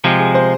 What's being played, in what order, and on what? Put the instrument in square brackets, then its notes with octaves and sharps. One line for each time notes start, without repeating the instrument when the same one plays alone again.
[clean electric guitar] C3 F3 G#3 [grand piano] G4
[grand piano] G#4
C5